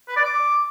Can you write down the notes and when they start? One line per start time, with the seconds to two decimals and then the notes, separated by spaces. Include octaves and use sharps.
0.08 B4
0.16 D5
0.24 D6